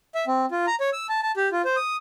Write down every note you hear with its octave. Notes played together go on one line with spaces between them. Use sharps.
E5
C4
F4
A#5
C#5
E6
A5
A5
G4
F4
C5
D#6